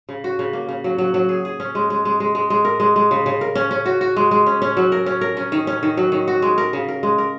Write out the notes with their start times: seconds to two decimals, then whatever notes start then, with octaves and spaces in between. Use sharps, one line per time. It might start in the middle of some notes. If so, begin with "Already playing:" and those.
0.09 C#3
0.24 F#4
0.39 C#3
0.53 A#3
0.69 C#3
0.84 F#3
0.98 F#3
1.14 F#3
1.29 G#4
1.45 G#4
1.60 C#4
1.75 G#3
1.90 G#3
2.05 G#3
2.20 G#3
2.35 G#3
2.50 G#3
2.65 A#4
2.80 G#3
2.96 G#3
3.11 C#3
3.26 C#3
3.41 A#4
3.55 C#4
3.71 C#4
3.86 F#4
4.01 F#4
4.16 G#3
4.31 G#3
4.46 C#4
4.62 C#4
4.77 F#3
4.92 A#4
5.06 C#4
5.21 A#4
5.37 C#4
5.52 D#3
5.67 C#4
5.83 D#3
5.97 F#3
6.12 D#3
6.28 F#4
6.42 G#3
6.58 A#4
6.73 C#3
6.88 A#4
7.03 G#3
7.18 A#4